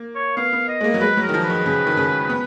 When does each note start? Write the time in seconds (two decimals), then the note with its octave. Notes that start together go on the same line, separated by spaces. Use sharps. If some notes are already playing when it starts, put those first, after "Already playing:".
Already playing: A#3
0.15 C#5
0.37 B3 F5
0.53 B3
0.68 D#5
0.81 G#3
0.84 A#3
0.94 F#3
1.00 G#3 B4
1.17 F#3
1.23 A#4
1.29 D#3
1.34 F3
1.44 B4
1.50 D#3
1.66 C#3
1.87 D#3
1.97 C#3
2.30 B3